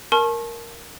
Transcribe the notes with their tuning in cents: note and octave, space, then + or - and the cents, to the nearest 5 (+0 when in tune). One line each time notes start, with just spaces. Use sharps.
A#4 +0 A5 -30 C#6 -35